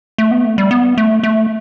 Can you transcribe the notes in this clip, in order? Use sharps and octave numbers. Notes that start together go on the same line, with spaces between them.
A3
B3
A3
G3
B3
A3
A3